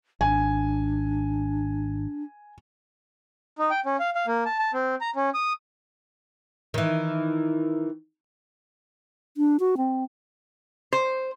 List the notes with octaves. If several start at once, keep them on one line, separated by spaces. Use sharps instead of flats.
G#1 D4 G#5
D#4
G5
C#4
F5
F5
A#3
A5
A5
C4
A#5
C#4
D#6
D#3 E3
D4
F#4
C4
C5